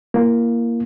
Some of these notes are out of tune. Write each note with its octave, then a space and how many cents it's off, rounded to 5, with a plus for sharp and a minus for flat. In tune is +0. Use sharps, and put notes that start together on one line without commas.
A#3 +0 E4 +30